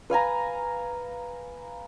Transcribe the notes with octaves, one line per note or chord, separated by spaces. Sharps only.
B4 F5 G#5 A#5